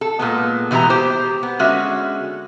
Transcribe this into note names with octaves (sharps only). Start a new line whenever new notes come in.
A4
A#2 G#3 B3
B2 E3 G#3 G4 A#5
G4 C5
B3
D3 G#3 C#4 F#4 E5